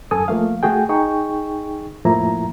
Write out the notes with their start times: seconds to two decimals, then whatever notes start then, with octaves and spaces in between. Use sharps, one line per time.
0.11 F#2 A4 G#5 D#6
0.28 F3 A3 A#3 F5
0.63 A3 F#4 G#4 G5
0.89 D#4 G#4 G5 C#6
2.05 F2 A2 F3 A#3 E4 A#5